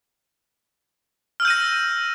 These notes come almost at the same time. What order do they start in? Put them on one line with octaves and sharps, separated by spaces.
F6 E6 G6 D#7 A#6